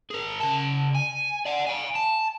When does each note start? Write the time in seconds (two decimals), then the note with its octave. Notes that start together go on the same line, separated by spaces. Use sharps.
0.10 G#4 A#4
0.40 C#3 A5
0.95 G#5
1.45 D5 F#5
1.66 F5 G#5
1.95 A5